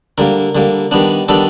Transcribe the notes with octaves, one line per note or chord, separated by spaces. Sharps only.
D3 G3 A#3 A#4
D3 G3 A#3
D#3 G3 B3 D4
D#3 G3 B3 D4 A4